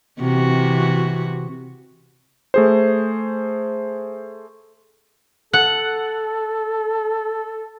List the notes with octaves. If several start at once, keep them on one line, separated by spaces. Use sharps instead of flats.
C3 E3 F#4
A3 G#4 C5
A4 F#5